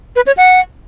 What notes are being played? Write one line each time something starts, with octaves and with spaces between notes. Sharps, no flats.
B4
C#5
F#5